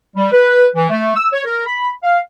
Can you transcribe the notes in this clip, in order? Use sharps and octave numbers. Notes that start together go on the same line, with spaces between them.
G3
B4
E3
A3
E6
C#5
A#4
B5
F5